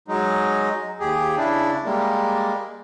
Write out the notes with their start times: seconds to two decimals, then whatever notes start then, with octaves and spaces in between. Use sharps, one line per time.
0.08 F#3 G#3 D#4
1.00 D#2 G4 G#4
1.37 C#3 D4 E4
1.84 G3 G#3 A#3